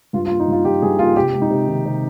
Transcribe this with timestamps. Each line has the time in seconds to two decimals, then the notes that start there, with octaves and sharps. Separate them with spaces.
0.13 G2 F4
0.26 F4
0.30 A#3
0.40 D#4
0.48 G2 F4
0.65 F3 G4
0.82 G2 G#4
0.99 A#3 F4
1.16 C3 G4
1.34 G#3
1.42 D#4
1.50 C3
1.67 D#3
1.85 C3